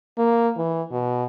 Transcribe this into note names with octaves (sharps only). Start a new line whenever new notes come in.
A#3
E3
B2